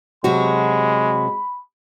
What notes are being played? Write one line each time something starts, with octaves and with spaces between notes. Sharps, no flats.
C3 F#3 G#3 F#4 B5